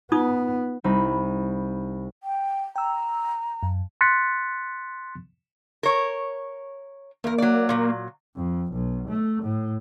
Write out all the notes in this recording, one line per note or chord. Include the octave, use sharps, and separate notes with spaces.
B3 D#4 F4 D#6
C2 D#4 B5
G5
G5 A#5 E6
F#2
C6 F#6 A6 B6 C#7
A#4 C#5
E2 A#3 A#4
F#3 D5
A#2 F#3
F2
B1
A3
A2